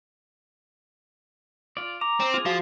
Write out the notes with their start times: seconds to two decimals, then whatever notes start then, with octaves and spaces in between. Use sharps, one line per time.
1.77 F4 D5
2.01 A#5 D6
2.20 C4
2.34 F4 G#4
2.46 F3 F#4 F5 C7